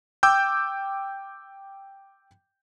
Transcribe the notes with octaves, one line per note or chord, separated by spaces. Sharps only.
G5 D6 E6 G6